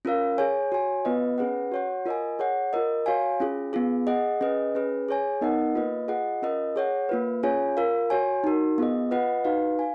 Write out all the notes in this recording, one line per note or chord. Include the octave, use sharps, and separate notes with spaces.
C#4 F4 A#4 F5
G#4 C#5 G#5
F#4 C#5 G#5
B3 F4 B4 D#5
C#4 G#4 B4 F#5
F#4 C#5 F#5
F4 A#4 D#5 G#5
G#4 C#5 F#5
F4 A#4 D#5
F#4 C#5 F5 G#5
C#4 F4 G#4
B3 F4 G#4
G#4 D#5 F#5
C#4 G#4 B4 D#5
C#4 G#4 B4
G#4 C#5 G#5
B3 D#4 A#4 D#5 F#5
A#3 F4 B4 D#5
F4 G#4 D#5 F#5
C#4 F4 A#4 D#5
G#4 C#5 F#5
A#3 F4 B4
C#4 F4 G#4 C#5 G#5
F4 A#4 F5
F#4 C#5 G#5
D#4 F#4 A#4
B3 F4 G#4 D#5
F4 B4 D#5 F#5
D#4 F#4 B4 F5
F5 G#5